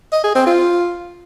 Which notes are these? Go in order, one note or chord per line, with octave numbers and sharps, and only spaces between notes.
D#5
G#4
C4
F4